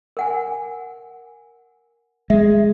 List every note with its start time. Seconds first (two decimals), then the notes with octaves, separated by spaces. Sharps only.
0.17 A#4 F#5 G#5
2.30 G#3 E5